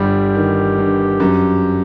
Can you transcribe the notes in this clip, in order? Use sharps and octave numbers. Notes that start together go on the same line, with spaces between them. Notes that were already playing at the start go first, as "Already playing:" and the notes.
Already playing: G1 G3 G4
D#3
G2
F#2